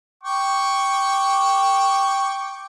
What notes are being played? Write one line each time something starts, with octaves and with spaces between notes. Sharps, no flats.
G5 C#6 D6